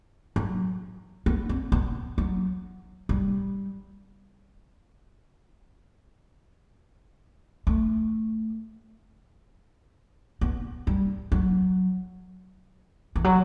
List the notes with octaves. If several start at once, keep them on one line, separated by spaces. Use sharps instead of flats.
F#3
B3
C4
B3
F#3
G3
A3
B3
G3
F#3
E3
F#3